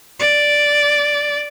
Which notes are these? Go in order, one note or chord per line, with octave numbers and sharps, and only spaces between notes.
D5